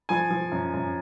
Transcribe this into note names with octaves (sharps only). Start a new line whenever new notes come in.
F3 G#5
F3
F#2
F#2